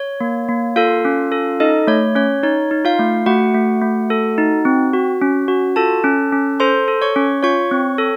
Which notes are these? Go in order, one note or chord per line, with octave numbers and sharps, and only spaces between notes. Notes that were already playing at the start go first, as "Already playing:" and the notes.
Already playing: C#5
A#3
A#3
F4 A4 F5
C#4
A4
D#4 A4 D#5
A3 C#5
C#4 C#5
D#4 C#5
D#4
F4 F5
A3
A3 F#4 F#5
A3
A3
A4
D#4
C4
F#4
C#4
F#4
F4 A4 A5
C#4
C#4
A4 C5 C6
A4
C#5 C#6
C#4
F4 C#5 C#6
C4
A4